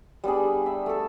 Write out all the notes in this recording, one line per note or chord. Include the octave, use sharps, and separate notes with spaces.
G3 B3 D4 G#4
E5
A3 A4